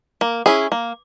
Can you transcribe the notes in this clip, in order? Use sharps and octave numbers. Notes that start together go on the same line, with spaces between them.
A#3
C#4 E4 G#4
A#3